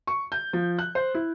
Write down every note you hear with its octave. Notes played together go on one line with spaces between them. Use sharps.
C#6
G6
F3
F#6
C5
E4